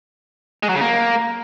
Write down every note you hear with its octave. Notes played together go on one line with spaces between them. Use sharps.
G#3
F#3
C#3
A#3